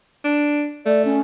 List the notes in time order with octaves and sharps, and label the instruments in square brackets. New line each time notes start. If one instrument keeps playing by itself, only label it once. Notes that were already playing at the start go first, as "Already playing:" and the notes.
[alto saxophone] D4
[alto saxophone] A3 [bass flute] D5
[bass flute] C#4